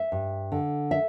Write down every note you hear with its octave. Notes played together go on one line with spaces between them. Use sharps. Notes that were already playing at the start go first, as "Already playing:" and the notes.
Already playing: E5
G2
D3
E5